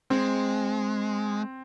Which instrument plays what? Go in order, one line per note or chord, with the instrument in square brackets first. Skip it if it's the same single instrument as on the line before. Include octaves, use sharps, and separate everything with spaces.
[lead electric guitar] G#3 [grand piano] C4